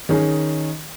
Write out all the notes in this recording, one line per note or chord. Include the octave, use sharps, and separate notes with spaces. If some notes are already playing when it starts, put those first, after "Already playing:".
D#3 C#4 D#4 G#4